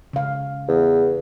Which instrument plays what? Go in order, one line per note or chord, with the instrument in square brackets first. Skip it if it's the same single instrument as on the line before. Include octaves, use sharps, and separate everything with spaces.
[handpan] C#3 F5
[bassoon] E2